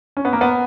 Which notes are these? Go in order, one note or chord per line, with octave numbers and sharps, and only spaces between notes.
C#4
B3
A#3
B3